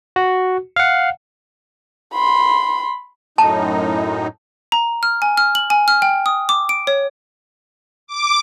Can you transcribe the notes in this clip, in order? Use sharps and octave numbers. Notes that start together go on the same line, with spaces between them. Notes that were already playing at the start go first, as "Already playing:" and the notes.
F#4
F5 F#5
B5 C6
F#2 A2 D#4 A5
A#5
F6
G#5
F6
F#7
G#5
F6
G5
D#6
D6
D7
C#5
D6